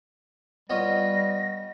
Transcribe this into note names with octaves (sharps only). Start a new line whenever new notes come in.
G3 B3 F4 C#5 D#5 A#6